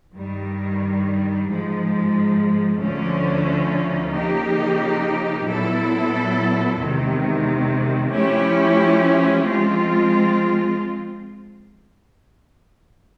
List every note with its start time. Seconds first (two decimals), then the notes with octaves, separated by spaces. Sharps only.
0.14 G2 D#3 G3
1.46 G#2 F3 G#3
2.79 D2 D3 F3 A3 C#4
4.12 C#3 F3 A#3 D#4 G4
5.46 A#2 F#3 B3 E4 A4
6.77 E2 C3 D#3 G#3
8.10 F3 A3 C#4 E4 G4
9.43 F3 G#3 C4 F4